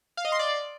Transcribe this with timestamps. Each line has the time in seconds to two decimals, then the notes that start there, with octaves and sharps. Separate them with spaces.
0.17 F5
0.25 D#5
0.32 C6
0.39 D5